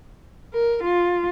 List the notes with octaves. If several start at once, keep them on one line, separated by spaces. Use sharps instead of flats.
A#4
F4